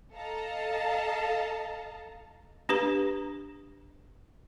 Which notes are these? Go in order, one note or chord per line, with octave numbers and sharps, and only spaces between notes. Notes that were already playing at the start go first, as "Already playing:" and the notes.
A4 D#5 F5 A5 A#5
D4 G4 B4 A#5